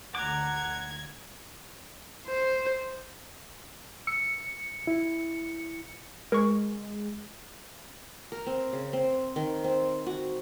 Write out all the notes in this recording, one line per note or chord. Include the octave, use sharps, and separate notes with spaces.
D2 D3 F#5 A#5 D6 G#6
C5
E6 C#7
E4
G#3 A#4 C#6
A#4
C4
C#3
C4
D#3
C4
F#4